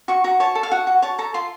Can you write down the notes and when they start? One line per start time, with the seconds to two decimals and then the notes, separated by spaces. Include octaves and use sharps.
0.08 F#4 C#6
0.24 F#4 A#5
0.40 C#5 A5
0.55 A4
0.63 F5
0.71 F#4 F#5
0.87 F#4
1.02 C#5 A5
1.18 A4 A#5
1.34 F4 C6